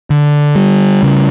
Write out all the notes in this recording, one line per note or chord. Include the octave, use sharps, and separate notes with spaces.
D3
G3
C#3